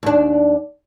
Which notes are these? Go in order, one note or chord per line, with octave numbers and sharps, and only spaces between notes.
D#2 D4